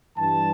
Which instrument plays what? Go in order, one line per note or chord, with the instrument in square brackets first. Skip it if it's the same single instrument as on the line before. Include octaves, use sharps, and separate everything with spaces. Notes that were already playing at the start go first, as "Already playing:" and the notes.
[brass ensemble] G2 E3 G3 A5